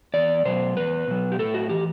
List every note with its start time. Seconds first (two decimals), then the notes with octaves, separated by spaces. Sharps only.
0.14 E2 D5
0.45 B2 F#3 C5
0.77 E2 B4
1.07 B2 F#3
1.32 G4
1.39 A2 A4
1.54 F#4
1.70 E3 G4